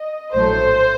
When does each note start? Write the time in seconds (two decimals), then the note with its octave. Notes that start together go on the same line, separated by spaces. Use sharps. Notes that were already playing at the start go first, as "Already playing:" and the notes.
Already playing: D#5
0.34 A#1 A2 F#3 A3 C5